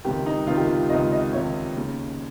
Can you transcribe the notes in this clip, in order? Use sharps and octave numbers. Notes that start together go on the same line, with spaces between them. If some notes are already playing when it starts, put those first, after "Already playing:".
C#2 C3 D#3 G4
D#4
C#2 C3 D#3 F4
G4
F4
C#2 C3 D#3 D#5
D#5
C#2 C3 D#3 C#5
D#2 C#3